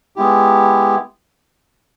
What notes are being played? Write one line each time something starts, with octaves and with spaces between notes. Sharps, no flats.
G#3 B3 E4 G4